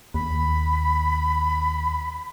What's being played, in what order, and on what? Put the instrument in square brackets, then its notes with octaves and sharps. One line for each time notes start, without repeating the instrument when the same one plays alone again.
[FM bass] D#2 [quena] B5